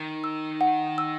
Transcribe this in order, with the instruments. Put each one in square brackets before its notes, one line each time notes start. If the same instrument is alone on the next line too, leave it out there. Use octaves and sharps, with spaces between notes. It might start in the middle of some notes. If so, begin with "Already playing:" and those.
Already playing: [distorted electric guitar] D#3
[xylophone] E6
F#5
E6